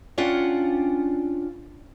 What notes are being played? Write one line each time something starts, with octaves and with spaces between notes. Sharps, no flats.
C#4 D4 F4 F#5 G5